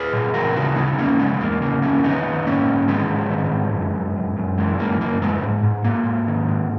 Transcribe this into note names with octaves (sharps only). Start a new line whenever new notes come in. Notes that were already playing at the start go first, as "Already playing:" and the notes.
Already playing: G#4 B4
A#2
E3 F#4 A#4
C#3 D#4 F#4
C#3 B3 D#4
E2 A#3 C#4
C#3 G#3 B3
E2 A#3
C#3 A#3
E2 A#3 C#4
D#3 B3 D#4
D#3
G#2 A#3 C#4
G#2
D#3 G#3 B3
G#2
D#3
G#2
F#2
F#2
F#2
F#2
E3 G#3
F#2 A#3
F#2 A#3
F#2 G#3 B3
G#2
G#2
G#2 A#3
G#2
D#3
G#2